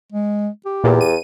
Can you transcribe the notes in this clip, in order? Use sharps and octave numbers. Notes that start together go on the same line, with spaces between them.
G#3
G4
E2 A#2
D#7